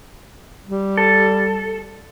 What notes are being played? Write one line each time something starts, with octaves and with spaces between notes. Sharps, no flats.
G3
A4